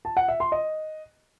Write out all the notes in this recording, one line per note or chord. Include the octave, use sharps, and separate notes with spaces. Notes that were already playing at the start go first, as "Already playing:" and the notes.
A5
F#5
E5
C6
D#5